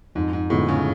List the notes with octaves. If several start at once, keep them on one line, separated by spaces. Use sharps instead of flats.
F2 G#2
G#2
A2 D3 G#3 B3 F4
C#3